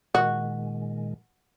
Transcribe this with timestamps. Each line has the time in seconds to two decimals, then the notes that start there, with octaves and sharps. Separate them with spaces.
0.15 A#2 D#3 G#3 F#4